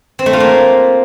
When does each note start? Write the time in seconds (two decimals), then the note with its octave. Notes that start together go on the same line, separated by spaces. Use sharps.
0.19 C4
0.26 A3
0.33 F4
0.40 A#3